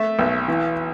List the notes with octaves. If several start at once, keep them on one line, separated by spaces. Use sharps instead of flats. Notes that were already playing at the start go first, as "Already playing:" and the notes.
Already playing: A3 E5
B1
E3